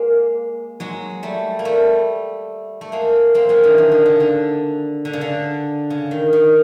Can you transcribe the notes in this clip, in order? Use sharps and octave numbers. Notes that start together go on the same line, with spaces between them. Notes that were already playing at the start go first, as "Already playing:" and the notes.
Already playing: G#3 A#3
F#3 G#3
G3 A3
A#3
G3 A3
A3
G#3 A#3
A#3 C4
F#3 G#3
D3 E3
D#3
D3
C#3
D3
D3
C#3
D3
C#3
D#3
D#3